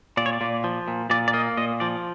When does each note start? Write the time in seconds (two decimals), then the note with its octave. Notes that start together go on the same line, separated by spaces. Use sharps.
0.17 A#2 D5
0.26 C#5
0.33 D5
0.41 A#2
0.64 F3
0.88 A#2
1.10 A#2 D5
1.28 D5
1.33 A#3 D#5
1.57 A#2 D#5
1.80 F3 D5